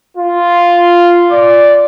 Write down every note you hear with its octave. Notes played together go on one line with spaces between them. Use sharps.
F4
D5